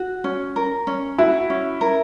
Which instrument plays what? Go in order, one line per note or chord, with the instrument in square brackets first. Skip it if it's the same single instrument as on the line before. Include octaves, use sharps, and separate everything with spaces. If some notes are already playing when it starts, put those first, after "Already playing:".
Already playing: [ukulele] F#4
C#4
A#4
C#4
[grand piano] E4 [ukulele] F#4
[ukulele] C#4
A#4